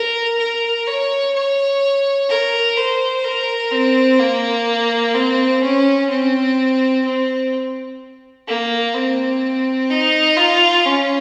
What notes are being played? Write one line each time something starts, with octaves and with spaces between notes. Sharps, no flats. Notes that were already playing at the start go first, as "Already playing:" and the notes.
Already playing: A#4
A#4
C#5
C#5
A#4
C5
A#4
C4
A#3
C4
C#4
C4
C4
A#3
C4
D#4
F4
C#4